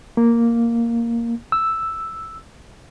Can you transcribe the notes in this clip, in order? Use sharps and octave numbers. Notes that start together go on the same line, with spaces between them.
A#3
E6